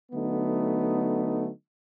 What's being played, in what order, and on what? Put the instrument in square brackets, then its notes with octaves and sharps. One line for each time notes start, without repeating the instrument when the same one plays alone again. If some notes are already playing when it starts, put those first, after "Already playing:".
[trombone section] D3 F#3 A3 B3 D#4